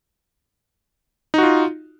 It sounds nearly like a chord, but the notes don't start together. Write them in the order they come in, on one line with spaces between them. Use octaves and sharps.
D#4 F#4 F4